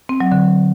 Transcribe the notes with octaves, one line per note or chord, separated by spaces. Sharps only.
C4
F#3
D3